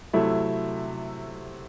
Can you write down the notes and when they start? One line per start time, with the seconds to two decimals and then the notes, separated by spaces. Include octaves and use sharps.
0.13 C3 F#3 A3 E4